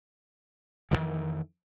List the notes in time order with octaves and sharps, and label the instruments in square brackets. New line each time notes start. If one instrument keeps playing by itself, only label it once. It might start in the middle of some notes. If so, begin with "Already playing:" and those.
[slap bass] F2 C3 D#3 E3